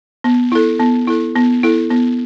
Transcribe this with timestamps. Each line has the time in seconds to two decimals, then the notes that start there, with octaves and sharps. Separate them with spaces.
0.24 B3
0.52 E4 A4
0.80 B3
1.07 E4 A4
1.35 B3
1.63 E4 A4
1.90 B3